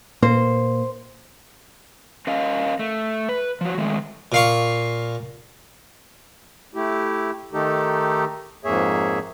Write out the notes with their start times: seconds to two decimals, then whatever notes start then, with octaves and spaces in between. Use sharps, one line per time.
0.23 A#2 A#3 C5
2.27 C#4 A#4 D#5 F5
2.79 A3
3.29 B4
3.61 F3 F#4
3.78 D#3 G#3 A3
4.32 A#2 F5 C#6
6.75 A3 E4 G4
7.53 D#3 A3 D#4 G4 A4
8.65 F2 G#2 A#3 G#4 C#5 E5